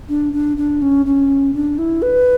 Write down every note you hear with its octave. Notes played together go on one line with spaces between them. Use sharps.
D4
D4
D4
C#4
C#4
D4
E4
B4